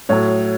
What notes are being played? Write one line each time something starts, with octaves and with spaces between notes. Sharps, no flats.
A2 F#3 C#5